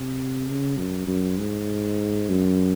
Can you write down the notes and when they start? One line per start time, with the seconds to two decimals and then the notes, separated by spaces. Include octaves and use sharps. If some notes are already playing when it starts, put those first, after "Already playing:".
Already playing: C3
0.47 C#3
0.78 F#2
1.07 F#2
1.38 G#2
2.29 F#2